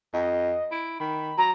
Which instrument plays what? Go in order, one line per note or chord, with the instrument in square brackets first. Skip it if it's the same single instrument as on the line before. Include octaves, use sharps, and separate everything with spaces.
[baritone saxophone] F2 [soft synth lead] D#5
[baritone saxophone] E4 [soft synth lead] D7
[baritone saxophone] D#3 [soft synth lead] B5
[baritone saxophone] F#3 [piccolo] A#5